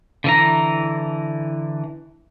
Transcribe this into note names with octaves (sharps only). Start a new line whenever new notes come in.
D3 E3 A#5